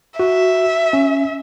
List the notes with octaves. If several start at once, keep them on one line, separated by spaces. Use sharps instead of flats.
F#4 E5
C#4